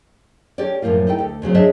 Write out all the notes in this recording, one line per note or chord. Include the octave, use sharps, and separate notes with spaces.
C#4 G4 A4 C#5 D5
F#2 A2 D3 F3 A#3 F4
D#4 E4 A4 G5
D2 A4
E2 C#3 F#3 C4
G#2 D4 G#4 C#5 D#5 E5